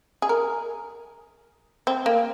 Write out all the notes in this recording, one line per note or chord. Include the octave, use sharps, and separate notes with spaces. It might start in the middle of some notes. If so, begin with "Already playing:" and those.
G#4
A#4
C4
A#3